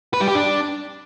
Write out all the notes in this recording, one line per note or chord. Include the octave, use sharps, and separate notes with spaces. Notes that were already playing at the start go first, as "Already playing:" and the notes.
B4
G3
G4
D4